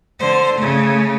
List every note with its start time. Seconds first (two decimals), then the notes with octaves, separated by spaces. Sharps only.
0.19 D3 C5
0.56 C#3 A3